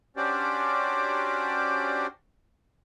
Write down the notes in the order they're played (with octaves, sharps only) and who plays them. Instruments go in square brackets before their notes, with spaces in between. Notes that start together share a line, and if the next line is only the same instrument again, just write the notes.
[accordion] C#4 D4 F#4 G4 C5 D5